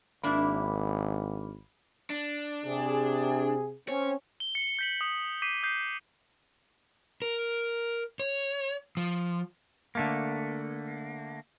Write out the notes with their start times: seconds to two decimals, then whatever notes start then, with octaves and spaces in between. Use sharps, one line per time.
0.23 G#1 A#3 D4 E4 B5
2.10 D4
2.65 C3 G#4
3.89 C4 C#4 C#5
4.40 G7
4.55 C7 C#7
4.79 G6 B6 F#7
5.01 D#6
5.42 D6 G6 B6 C7 D#7
5.63 D#6 G6 C7
7.22 A#4
8.20 C#5
8.97 F3
9.95 D3 A3 A#3